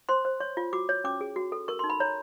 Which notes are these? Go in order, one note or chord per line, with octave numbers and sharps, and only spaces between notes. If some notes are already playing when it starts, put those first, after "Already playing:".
C5 C6
C5
C#5 C#6
F4
F#4 D6
C#5
C#4 D6
G#4
F#4
A4
A#4 C#6
C6
D#4
B5
C#5 A#5